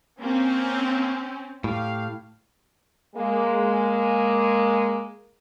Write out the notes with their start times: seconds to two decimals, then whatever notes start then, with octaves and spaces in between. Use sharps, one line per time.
0.21 A#3 C4 C#4
1.64 A2 G4 F5
3.16 G#3 A#3